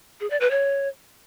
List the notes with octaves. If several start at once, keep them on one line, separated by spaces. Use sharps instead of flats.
G#4
D5
B4
C#5